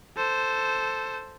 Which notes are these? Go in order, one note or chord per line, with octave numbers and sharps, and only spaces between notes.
A4 C5